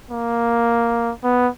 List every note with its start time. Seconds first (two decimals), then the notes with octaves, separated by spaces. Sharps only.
0.11 A#3
1.24 B3